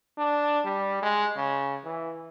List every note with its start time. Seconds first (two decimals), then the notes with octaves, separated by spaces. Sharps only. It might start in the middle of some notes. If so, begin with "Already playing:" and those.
0.18 D4
0.65 G3
1.02 G#3
1.36 C#3
1.84 E3